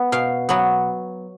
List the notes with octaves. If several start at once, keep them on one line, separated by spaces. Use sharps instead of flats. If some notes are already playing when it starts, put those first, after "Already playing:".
Already playing: B3
B2 F5
F#3 B3